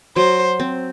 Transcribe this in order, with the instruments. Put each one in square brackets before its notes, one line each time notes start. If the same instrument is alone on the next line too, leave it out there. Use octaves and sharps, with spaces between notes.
[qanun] F#3 [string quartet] C5
[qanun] C4